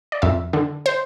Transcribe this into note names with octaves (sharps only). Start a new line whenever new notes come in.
D5
F2 E5
D3
C5